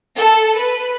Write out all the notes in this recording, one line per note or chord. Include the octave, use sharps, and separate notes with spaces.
A4
B4